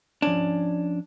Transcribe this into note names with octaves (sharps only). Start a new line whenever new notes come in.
F3 C#4 D4 C#5